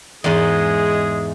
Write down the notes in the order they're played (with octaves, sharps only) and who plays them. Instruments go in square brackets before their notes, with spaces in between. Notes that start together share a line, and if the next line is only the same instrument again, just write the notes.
[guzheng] E2 G#2 [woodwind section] G#3 G#4